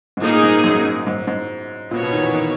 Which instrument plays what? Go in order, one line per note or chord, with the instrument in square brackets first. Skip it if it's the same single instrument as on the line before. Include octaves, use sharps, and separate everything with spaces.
[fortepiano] G#2
[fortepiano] A#2 [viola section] A#3 D#4 G#4
[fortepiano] G#2
F#2
G#2
G#2
G#2
[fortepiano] A#2 [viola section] B3 F#4 C#5
[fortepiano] B2
D#3
E3
D#3